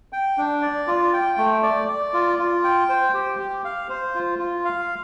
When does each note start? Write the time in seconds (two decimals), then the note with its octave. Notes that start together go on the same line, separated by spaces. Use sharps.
0.13 G5
0.38 D4
0.62 D5
0.87 F4
1.13 G5
1.37 A3
1.63 D5
1.88 D5
2.13 F4
2.39 F4
2.64 G5
2.89 C5
3.14 G4
3.39 G4
3.64 F5
3.89 C5
4.15 F4
4.39 F4
4.65 F5